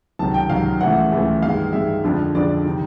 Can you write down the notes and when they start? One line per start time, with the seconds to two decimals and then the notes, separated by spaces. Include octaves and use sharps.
0.19 C#2 C3 D#3 F#3 A5
0.34 G5
0.49 C#2 C3 D#3 F#3 F5
0.80 C#2 C#3 E3 A3 F#5
1.11 C#2 C#3 E3 A3
1.42 G2 D#3 G#3 F5
1.73 G2 D#3 G#3 E5
2.04 F2 D3 F3 G#3
2.35 F2 D3 F3 G#3 D5
2.65 C3 D#3